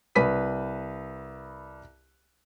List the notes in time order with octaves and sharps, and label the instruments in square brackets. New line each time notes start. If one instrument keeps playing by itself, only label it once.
[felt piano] C2 B4 B5 B6 D#7